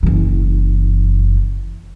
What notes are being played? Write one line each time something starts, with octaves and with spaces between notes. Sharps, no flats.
F#1 E3